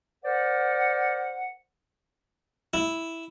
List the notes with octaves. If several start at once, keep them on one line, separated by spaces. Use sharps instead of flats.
A#4 C5 D5 F#5
E4